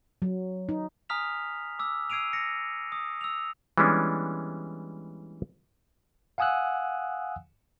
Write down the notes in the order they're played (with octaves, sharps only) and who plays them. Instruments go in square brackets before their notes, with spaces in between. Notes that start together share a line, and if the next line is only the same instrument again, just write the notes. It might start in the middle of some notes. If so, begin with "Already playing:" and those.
[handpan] F#3
D#4
[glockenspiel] G#5 A#5 D#6 F6 B6 F7
D6 E6
E6 G#6 C7 D7 D#7 F7
A#6 C#7 D7
D#6
E6 F7
[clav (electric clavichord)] E3 G3 G#3 B3 C#4 D4
[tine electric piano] F5 F#5 G#5 D#6 E6 F#6